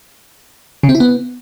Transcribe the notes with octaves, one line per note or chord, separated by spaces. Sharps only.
C#3
C4
E4
B3